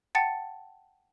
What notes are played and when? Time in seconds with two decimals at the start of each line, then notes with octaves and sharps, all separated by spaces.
0.15 F#5 G5 A5 A6 C#7